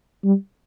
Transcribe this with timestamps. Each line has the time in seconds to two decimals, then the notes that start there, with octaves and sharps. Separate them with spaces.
0.24 G3